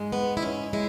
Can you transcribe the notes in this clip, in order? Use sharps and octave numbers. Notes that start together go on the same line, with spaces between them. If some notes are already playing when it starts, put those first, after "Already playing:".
Already playing: G#2 G#3
B3
E4
C#4
G#3 E4